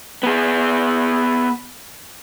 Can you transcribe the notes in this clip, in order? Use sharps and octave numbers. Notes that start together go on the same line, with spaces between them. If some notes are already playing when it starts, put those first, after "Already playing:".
B3 G#4